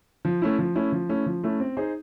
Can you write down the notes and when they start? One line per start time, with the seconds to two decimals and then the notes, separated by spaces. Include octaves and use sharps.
0.25 F3
0.42 A3 C#4 E4
0.59 F3
0.75 A3 C#4 E4
0.92 F3
1.09 A3 C#4 E4
1.26 F3
1.44 A3 C#4 E4
1.60 C4
1.77 D#4 G#4 C5